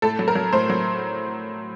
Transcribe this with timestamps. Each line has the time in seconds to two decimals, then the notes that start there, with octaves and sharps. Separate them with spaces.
0.02 A2 A4
0.19 F#3
0.28 A#4
0.35 F#3
0.53 A2 C5
0.69 F#3